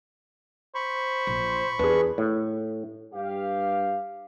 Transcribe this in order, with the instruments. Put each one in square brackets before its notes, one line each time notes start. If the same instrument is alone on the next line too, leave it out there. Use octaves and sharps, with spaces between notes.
[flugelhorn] C5 [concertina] B5 C#6
[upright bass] A#1
[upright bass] E2 [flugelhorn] D4 [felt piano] G#4 B4
[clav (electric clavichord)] A2
[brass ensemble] G2 G4 F5